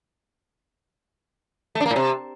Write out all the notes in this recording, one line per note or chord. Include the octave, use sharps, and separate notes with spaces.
A3
D4
A#3
A2
C3